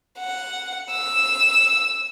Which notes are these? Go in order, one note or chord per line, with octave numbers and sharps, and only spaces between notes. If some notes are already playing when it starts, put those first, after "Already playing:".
F#5
E6